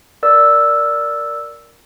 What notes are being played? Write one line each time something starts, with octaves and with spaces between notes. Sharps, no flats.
A#4 D5 E6